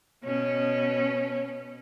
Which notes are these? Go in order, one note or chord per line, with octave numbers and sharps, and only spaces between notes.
B2 C#4